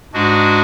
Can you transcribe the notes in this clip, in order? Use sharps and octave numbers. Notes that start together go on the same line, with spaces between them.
G#2 G#3 D4 F#4